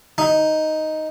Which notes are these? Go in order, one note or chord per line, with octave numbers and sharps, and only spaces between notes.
D#4